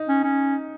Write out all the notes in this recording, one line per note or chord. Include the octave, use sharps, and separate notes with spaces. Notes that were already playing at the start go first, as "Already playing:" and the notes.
Already playing: D#4
C#4
C#4